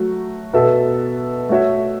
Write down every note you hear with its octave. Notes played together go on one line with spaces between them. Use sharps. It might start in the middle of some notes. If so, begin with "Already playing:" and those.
Already playing: F#3 A3 F#4
B2 B3 A4 E5
A3 F#4 C#5 E5